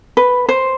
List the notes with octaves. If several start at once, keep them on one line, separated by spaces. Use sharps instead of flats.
B4
C5